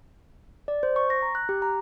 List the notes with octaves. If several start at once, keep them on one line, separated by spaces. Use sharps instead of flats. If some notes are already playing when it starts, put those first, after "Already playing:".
D5
C5
C#6
A#6
A#5
F#6
G4
A#5